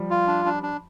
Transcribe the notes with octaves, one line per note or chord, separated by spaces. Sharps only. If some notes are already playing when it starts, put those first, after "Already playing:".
Already playing: F3 G3
F4
D4
D4
D4